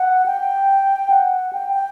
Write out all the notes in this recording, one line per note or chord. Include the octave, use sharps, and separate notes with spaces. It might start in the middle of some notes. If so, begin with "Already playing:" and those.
Already playing: F#5
G5
F#5
G5
G5